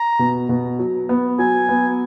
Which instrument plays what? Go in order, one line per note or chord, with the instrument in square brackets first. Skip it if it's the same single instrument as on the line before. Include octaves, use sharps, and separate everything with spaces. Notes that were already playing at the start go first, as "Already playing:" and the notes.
Already playing: [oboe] A#5
[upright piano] B2
B2
F#3
B3
[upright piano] F#3 [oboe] G#5
[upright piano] B3